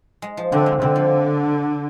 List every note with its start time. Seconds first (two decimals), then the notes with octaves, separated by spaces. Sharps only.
0.22 G#3
0.37 F3
0.52 D3 C4
0.66 G#3
0.81 D3 C4
0.96 F3